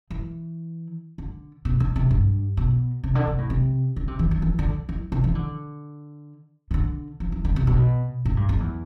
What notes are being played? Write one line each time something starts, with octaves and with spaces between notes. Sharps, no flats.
E3
D3
B2
D3
C3
G2
B2
C3
D3
C3
A2
C3
D3
C3
E3
E3
E3
D3
E3
C3
E3
D3
C3
D3
F3
E3
D3
C3
B2
A2
G2
F2
E2